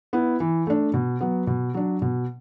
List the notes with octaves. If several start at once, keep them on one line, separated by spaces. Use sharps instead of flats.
B3 E4
E3
A3 D4
B2
F#3 B3
B2
F#3 D4
B2